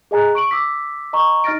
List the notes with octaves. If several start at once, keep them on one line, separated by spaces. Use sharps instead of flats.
G#4 D#5 G#5 A#5 F#6
C#6 D7 F#7
D6 E6 B6
D#5 A#5 C#6
D#4 D#5 F6 A6 A#6 D7